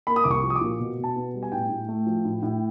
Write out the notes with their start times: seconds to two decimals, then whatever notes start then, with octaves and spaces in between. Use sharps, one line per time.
0.07 A#3 B5
0.16 D#6
0.24 C2 D6
0.31 C#6
0.43 F3
0.50 D#6
0.55 D6
0.61 A#2
0.79 B2
0.98 B2
1.04 A5
1.16 B3
1.34 G3
1.43 G#5
1.52 A2 G5
1.70 A2
1.88 A3
2.06 F3
2.25 A2
2.43 A2